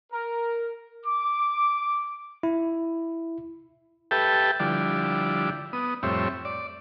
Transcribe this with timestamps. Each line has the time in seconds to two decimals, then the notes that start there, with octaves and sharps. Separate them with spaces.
0.12 A#4
1.06 D6
2.43 E4
4.11 G4 A4 B4 E5 G5 A5
4.60 D3 F3 G3 E4 D5
5.73 B3 D#6
6.03 F2 A2 G3 C4 C#5 E5
6.45 D5